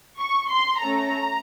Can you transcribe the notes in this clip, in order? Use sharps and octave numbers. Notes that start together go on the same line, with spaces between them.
C#6
C6
A3 C#4 A4 A#5